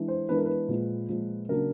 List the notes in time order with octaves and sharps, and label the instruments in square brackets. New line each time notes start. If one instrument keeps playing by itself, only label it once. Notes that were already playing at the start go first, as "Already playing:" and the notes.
Already playing: [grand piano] E3 G#3 D4
C5
E3 G#3 B3 D4 B4
A#4
B4
A#2 F3 G#3
A#2 F3 G#3
C#3 F#3 A#3 D4 A#4